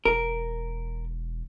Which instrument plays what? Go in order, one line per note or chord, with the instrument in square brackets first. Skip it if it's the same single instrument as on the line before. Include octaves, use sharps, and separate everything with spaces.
[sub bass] E1 [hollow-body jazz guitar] A#4